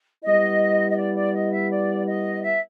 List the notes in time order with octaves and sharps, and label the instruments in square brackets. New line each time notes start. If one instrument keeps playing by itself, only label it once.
[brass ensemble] G3 B3 E4 [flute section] D#5
[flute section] D#5
D5
D5
D#5
E5
D5
D#5
E5